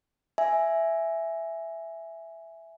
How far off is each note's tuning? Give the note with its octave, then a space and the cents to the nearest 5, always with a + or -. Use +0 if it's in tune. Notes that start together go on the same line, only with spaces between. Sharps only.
E5 +0 G#5 +0